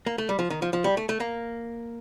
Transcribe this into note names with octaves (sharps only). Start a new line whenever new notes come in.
A#3
A3
G3
F3
D#3
F3
F3
G3
A3
A3
A#3